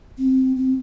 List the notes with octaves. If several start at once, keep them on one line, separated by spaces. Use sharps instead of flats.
C4
C4